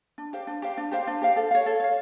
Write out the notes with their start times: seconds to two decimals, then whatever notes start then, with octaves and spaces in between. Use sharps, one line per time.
0.18 D4
0.33 G4 C5 F5
0.47 D4
0.62 G4 C5 F5
0.78 D4
0.91 G4 C5 F5
1.07 D4
1.21 G4 C5 F5
1.36 A4
1.51 C#5 F5
1.66 A4
1.80 C#5 F5